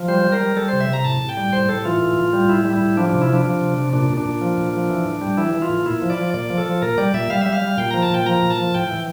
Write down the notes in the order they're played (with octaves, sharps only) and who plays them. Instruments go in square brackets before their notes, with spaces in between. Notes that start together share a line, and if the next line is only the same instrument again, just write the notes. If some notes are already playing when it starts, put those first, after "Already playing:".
Already playing: [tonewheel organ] F3
G3 C5
G3
A#4
G3
G3 A4
C3 C5
E5
C3 A#5
A2 A5
A2
G5
G3
A2 C5
A2 A4
E3 F4
A2
A2
G3
A2 E4
G3
E4
A2
F3 D4
C3 D4
E4
F3 D4
F3
C3
C3
A#2 D4
A#2
D4
A#2
F3
A#2
F3
E3
A2
G3
E3 E4
E3
F4
A2
A#2 E4
F3
D5
F3
A#2 D5
F3
A4
F3
A#2 A#4
G3 D5
A#2 E5
G3 F5
E5
G3
F5
G3
A#2 G5
F3 A#5
A5
A#2 G5
F3 A#5
A#2
A5
F3
A2 G5
E3